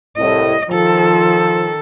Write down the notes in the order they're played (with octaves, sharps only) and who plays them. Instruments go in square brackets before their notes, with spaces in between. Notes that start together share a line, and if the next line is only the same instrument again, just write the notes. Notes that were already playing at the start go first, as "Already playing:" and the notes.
[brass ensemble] C2 A2 [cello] D#5
[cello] D#3 A4 [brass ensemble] F3